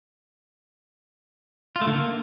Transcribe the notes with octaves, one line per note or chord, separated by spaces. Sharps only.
F4
A3
D3
A#3